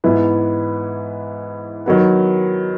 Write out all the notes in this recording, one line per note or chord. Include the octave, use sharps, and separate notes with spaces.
G#2 E3 B3 E4
D#3 F#3 B3